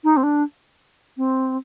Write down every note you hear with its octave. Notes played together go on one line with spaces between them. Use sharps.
D#4
C4
D4
C4